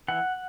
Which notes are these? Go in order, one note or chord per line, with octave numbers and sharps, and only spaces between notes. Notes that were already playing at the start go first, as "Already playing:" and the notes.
E3 F#5